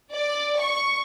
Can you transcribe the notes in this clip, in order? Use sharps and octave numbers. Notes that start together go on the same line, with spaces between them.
D5
C#6